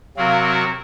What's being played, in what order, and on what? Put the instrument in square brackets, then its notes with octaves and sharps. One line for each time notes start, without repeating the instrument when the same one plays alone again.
[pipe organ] C3 F#3 C4 F#4 A#4 [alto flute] F5